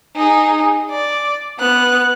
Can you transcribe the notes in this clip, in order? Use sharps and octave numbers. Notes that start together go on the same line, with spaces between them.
D#4 G#4
D5
B3 F#6